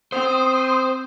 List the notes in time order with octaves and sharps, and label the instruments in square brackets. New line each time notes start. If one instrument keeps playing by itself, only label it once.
[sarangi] C4 [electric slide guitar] C5 [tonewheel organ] C6 D#6